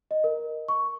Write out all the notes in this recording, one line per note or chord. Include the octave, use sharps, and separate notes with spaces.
D#5
A#4
C#6